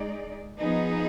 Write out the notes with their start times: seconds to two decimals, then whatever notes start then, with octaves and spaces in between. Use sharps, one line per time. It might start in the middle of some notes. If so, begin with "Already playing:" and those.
Already playing: G#3 D#4 G#4 D5
0.58 F3 B3 D#4 G#4